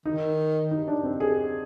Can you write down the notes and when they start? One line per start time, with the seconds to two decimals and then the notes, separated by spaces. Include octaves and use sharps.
0.06 D#3 D#4
0.71 D#4
0.88 D4
1.03 C4
1.20 G#4